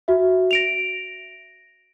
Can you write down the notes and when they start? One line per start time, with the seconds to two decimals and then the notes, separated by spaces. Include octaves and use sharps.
0.08 F#4 E5
0.51 A#6 D7 F7